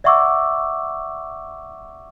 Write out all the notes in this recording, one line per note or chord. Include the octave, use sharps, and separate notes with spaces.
D5 E5 F#5 C#6 D6 E6